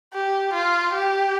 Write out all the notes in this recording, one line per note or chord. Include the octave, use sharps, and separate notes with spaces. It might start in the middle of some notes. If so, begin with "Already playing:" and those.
G4
F4
G4